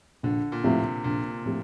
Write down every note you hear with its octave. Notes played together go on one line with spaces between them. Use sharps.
A#1 D3
A#2
A2 C3 F3 C4 G4
A#1 A#2
A2 F3 C4 G4